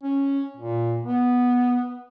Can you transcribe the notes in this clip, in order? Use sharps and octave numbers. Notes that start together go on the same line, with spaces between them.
C#4
A#2
B3